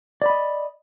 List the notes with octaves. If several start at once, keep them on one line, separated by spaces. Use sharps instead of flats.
D5 D#5 B5